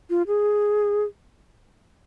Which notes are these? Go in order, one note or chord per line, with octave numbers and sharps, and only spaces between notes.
F4
G#4